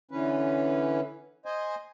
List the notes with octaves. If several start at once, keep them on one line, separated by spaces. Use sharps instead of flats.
D3 E3 C#4 B4
C5 D#5 G#5